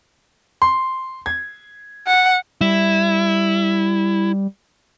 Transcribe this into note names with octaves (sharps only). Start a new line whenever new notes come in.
C6
G#6
F#5
G3 E4